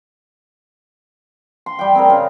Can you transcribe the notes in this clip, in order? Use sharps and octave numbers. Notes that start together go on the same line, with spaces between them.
C6
G3 G5
C4 G#4 A#4
C#3